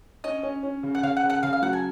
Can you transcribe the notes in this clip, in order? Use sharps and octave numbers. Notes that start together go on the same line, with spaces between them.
C#4 D#5
C#4
C#4
C#3
F#5
C#3 F5
F#5
C#3
F#5
C#3 F5
F5
F#3 F#5
G#5